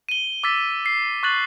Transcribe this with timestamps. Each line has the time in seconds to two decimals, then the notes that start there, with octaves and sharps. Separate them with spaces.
0.09 D#7 G7
0.44 D6 E6 A6 B6
0.86 C7
1.23 C#6 F#6 A6 F#7